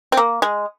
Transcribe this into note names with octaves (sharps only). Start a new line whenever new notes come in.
C4
A#3
G#3